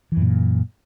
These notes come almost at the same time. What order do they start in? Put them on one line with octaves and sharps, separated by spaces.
E3 F#2 A#2